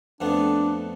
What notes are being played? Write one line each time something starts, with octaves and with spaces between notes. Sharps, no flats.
F2 A3 B3 D4